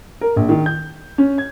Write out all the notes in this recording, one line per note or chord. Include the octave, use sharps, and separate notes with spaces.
A#4
A#1
D#3
G6
C#4
G#6